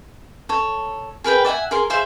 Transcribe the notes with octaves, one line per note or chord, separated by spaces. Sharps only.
A4 C#5
G#4 A#4 B4 G5
D5 E5 F#5 G#5
G#4 A#4 C6
G#4 C5 E5 F5